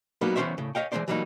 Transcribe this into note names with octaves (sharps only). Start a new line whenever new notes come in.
F#3 G3 A#3 B3 D#4
E3 B3 C#4 C5 C#5 E5
A2 C#3
C#5 D#5 F5 G5
E3 G#3 A#3 B3 C5 D5
E3 F#3 G3 A#3 D#4